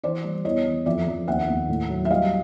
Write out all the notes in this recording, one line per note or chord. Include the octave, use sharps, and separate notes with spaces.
E3 C5 D5
G3
E2 C#5 D#5
E2
F2 D5 E5
F2
D#2 E5 F#5
D#2
A2
F#3
E5
G3 D#5 F5